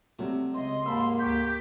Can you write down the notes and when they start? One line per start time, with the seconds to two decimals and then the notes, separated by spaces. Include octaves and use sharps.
0.19 C3 F#3 G3 A3
0.54 C#2 D#5 C6
0.86 D#2 G#2 A#3 A5 B5 E6
1.19 D2 A#3 G4 C#6 D6 G6 B6